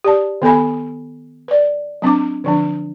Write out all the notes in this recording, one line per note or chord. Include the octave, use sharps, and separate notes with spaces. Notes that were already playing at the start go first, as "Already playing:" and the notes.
G4 D5 A5
D#3 B3 A4 G#5 B5
B4 D5
F#3 C4 D4 D6
D3 F3 D4